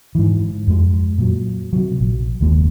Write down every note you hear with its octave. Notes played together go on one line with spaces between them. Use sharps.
G#2 E3
F2 G#3
A#2 F#3
C3 F#3
A#1
F#1 D#2 G#3 A#3